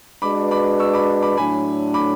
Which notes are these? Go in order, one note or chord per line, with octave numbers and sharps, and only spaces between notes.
G#3 D4 F#4 B4 B5 D6
B5 D6
C#6 E6
B5 D6
B5 D6
A2 F#3 A3 D4 G#5 B5
B5 D6